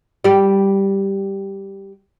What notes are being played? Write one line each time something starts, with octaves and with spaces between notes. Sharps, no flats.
G3 G4